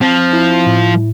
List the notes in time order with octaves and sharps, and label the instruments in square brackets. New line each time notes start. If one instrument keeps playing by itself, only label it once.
[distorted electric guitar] F3 [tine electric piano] C4
[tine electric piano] E4
A2